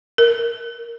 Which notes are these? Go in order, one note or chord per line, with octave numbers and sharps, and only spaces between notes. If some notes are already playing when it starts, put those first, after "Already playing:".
A#4